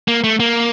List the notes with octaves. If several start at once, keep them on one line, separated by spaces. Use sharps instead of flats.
A#3
A3
A#3